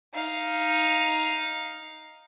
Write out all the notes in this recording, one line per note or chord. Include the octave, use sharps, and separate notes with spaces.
D#4 F5